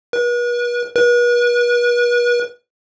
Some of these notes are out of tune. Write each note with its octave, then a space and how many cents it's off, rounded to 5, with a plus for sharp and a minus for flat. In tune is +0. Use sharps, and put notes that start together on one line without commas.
B4 -40
B4 -40